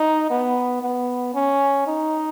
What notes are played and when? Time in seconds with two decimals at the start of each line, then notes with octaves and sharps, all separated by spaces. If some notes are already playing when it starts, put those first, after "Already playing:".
Already playing: D#4
0.30 B3
0.82 B3
1.34 C#4
1.87 D#4